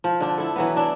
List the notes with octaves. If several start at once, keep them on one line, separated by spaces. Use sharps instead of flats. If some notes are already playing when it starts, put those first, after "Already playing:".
F3
D3 D4
E4 A4
E3 F#3 B3
D4 E4